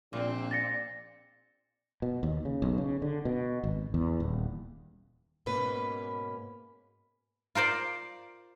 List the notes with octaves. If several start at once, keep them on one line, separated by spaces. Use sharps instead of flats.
A#1 A#2 C4
A6 A#6 C#7
B2
D#2
C#3
B1
C#3
D3
B2
G#1
E2
D#1
G#2 B2 A#3 C#4 B4
F4 A#4 C5 D5